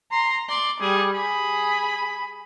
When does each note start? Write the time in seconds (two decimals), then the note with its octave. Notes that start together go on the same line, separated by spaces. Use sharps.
0.12 A#5 C6
0.49 D5 C6
0.81 G3 G#4
1.14 G#4 B5